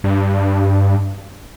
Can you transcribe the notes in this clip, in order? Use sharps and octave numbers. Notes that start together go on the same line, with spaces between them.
G2